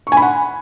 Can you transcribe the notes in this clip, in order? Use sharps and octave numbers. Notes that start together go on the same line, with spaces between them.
C#6
G#5
B5
F#5